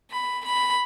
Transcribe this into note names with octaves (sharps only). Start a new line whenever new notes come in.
B5
B5